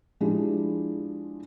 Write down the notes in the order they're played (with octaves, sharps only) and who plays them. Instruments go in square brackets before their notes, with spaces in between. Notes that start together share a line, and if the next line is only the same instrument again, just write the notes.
[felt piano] F3 G#3 D4 E4 G4